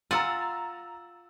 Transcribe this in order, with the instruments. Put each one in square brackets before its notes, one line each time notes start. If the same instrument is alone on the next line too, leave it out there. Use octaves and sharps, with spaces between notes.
[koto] F4 F#5 G#5 [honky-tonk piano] A#5 E6 A6